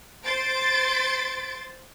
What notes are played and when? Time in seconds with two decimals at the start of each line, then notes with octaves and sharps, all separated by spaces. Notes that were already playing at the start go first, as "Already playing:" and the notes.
0.23 C5 C6 A6 D7